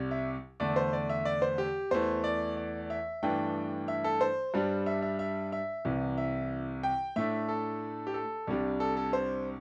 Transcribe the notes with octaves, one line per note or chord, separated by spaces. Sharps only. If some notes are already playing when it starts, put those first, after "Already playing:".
Already playing: C2 C3 G3
E5
E2 D3 A3 D5
C5
D5
E5
D5
C5
G4
E2 E3 A3 C5
D5
D5
E5
G2 E3 A3 D4 G5
E5
A4
C5
G2 G3 D4
E5
E5
E5
E5
C2 C3 E3
E5
G5
A2 A3 D4 E5
A4
G4
A4
C2 C3 G3 D4
A4
A4
C5